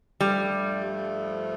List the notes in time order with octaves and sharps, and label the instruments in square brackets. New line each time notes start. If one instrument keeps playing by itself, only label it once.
[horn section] G2 F3 A3 [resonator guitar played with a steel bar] G3